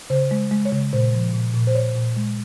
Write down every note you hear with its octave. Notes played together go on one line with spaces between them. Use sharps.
C#3 C5
G#3
G#3
C#5
C#3
A#2 C5
F3
A#2
A#2
C5
A#2 C#5
A#2
G#3